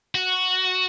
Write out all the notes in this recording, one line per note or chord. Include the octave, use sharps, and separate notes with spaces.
F#4